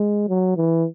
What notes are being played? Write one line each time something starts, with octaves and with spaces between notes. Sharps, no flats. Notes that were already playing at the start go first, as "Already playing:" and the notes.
Already playing: G#3
F#3
E3